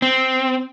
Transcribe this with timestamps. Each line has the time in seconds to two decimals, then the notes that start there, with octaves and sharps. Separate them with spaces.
0.02 C4